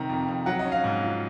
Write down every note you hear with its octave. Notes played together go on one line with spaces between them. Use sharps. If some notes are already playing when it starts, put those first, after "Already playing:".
Already playing: C3 D#3 A#5
F2
F2
F#3 F#5
D#5
C#4
F5
G#2
F4